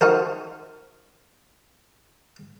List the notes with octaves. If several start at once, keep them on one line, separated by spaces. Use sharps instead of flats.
D#4 F#4 A#4 C5